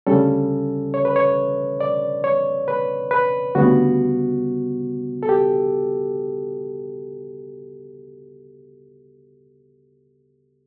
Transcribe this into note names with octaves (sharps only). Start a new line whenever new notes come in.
D2 C#3 G3 C#4 A4
C#5
B4
C#5
D5
C#5
B4
B4
D2 C#3 G3 B3 F#4
A4
G4